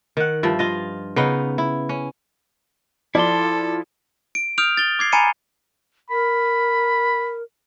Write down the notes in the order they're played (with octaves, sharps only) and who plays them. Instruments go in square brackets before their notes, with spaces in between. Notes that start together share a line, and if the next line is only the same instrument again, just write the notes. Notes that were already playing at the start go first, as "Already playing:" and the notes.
[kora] D#3 F#5
G2 F3 E5
F4 D#5
C#3 B3 D#4
E4
C#4
[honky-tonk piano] F3 [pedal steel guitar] E4 C6 [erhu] A4 [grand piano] D5
[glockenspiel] D7
D#6 F6 G6 D7 F7
A6 G7
D6 G#6 C7
G#5 A#5 B5 C#7 D#7
[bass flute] A#4 [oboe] B5